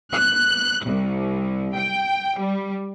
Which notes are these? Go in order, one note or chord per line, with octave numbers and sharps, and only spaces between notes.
F#6
C2
G5
G3